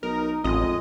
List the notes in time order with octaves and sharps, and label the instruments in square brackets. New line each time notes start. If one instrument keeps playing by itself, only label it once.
[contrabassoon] B1 [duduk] D#4 [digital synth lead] A#4
[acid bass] A1 [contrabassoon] F2 [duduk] G#3 [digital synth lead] D#5